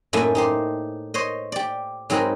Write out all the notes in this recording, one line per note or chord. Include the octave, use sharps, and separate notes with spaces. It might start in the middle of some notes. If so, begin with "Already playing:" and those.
F#2 A2 A3 A#3 D#4 G#5
D#4 G4 C5
C5 C#5 D#5
G4 D5
G#2 F#3 C4 D#4 A#4 B5